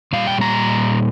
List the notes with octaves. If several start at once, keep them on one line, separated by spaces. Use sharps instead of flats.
A#2 G3 F5
G5
A#5